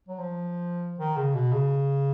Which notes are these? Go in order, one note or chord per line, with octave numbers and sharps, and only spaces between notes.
F#3
F3
D#3
C#3
B2
C#3